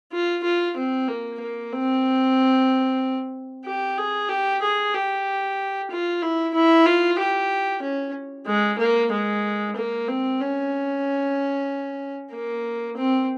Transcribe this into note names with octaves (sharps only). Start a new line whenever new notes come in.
F4
F4
C4
A#3
A#3
C4
G4
G#4
G4
G#4
G4
F4
E4
E4
F4
G4
C#4
G#3
A#3
G#3
A#3
C4
C#4
A#3
C4